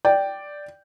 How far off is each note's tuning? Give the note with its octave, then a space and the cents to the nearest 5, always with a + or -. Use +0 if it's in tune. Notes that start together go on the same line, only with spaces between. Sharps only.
D5 +0 G5 -5